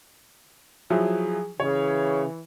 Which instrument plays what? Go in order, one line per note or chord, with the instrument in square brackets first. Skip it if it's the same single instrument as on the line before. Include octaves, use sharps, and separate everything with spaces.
[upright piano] F3 F#3 E4 [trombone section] G#4
[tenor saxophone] C#3 [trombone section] E3 [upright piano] C#5